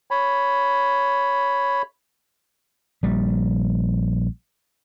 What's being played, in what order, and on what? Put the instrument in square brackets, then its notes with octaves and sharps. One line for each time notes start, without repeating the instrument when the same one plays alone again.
[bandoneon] C#5 B5
[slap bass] A#1 G3